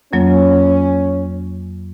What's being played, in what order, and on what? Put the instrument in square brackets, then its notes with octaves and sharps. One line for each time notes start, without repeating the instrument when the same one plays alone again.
[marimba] F2 F#3 A#3 [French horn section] C#4